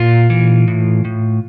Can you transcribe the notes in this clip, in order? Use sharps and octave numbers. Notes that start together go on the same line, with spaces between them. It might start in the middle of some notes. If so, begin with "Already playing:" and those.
Already playing: A#2 F4
E3
A2
A2